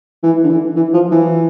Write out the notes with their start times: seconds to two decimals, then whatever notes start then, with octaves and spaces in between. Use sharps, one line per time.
0.23 E3
0.44 D3
0.49 E3
0.76 E3
0.94 F3
1.11 E3